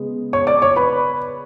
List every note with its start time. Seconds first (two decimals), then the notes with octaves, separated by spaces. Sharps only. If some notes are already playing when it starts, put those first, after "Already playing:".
Already playing: C#3 G#3 B3
0.33 C#5 C#6
0.47 D5 D6
0.62 C#5 C#6
0.76 B4 B5